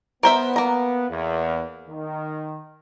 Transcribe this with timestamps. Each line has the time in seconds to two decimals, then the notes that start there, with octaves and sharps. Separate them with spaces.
0.23 B3 A#4 C5 E5
0.56 A#3 A#5
1.10 E2
1.89 D#3